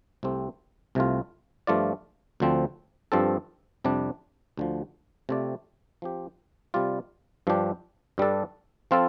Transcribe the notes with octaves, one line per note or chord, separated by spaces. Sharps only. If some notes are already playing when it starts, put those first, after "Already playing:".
C2 C3 A3 C4 G4
C2 C3 A3 F4
G2 F3 A3 F4 D5
D2 D3 F3 C4
G2 F3 C4 A4
F2 C3 G3 D4
D2 D3 F3
C3 A3 C4 F4 D5
F3 C4 G4
C3 G3 F4 D5
G2 F3 D4 G4
G2 G3 D4 A4
F3 C4 F4 A4